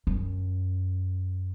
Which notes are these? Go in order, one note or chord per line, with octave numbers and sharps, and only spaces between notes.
F#2